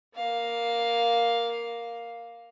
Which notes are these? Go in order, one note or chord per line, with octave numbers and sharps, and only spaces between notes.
A#3 F5